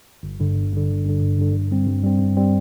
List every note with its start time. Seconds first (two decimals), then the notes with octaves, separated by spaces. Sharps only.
0.23 G1
0.40 G2 D3
0.55 G1
0.73 G2 D3
0.89 G1
1.05 G2 D3
1.21 G1
1.39 G2 D3
1.54 G2
1.71 G3 C4
1.87 G2
2.04 G3 C4
2.20 G2
2.37 G3 C4